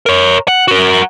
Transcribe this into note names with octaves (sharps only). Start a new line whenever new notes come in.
A#4 C#5
F#5
F#4 A#4